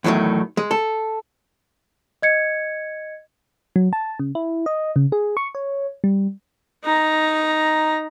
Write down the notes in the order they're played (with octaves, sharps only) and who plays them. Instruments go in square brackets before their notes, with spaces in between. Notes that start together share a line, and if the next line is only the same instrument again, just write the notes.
[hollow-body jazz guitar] E2 A2 D#3 F#3 A3
G#3
A4
[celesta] D#5 G#6 C#7
[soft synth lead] F#3
A5
C#3
E4
D#5
C#3
G#4
C#6
C#5
G3
[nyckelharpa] D#4 A#5